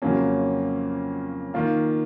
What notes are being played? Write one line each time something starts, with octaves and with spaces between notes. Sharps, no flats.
F2 C#3 F#3 A#3 C#4
D#3 A#3 F4